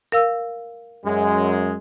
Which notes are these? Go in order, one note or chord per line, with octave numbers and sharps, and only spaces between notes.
A#4 F5 E6
F#2 G#3